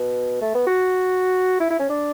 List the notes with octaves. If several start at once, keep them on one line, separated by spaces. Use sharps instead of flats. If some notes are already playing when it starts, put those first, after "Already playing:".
Already playing: B2
A3
B3
F#4
E4
E4
C#4
D4